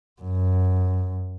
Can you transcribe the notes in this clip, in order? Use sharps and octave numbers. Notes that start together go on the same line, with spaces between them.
F#2